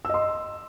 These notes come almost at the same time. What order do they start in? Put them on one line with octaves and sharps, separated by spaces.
E6 D#5 C6